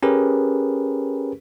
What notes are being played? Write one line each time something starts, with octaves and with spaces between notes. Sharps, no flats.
C#4 G4 G#4 A#4 B4